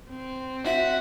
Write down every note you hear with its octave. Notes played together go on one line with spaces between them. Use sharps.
C4
F#4 E5